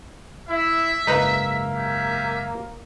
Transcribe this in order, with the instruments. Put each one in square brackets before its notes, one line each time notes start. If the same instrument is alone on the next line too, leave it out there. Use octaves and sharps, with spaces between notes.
[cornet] E4 [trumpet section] E5
[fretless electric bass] F#1 G#2 [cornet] A#3 [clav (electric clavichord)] D#4 B4
[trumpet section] C#4 G4 E5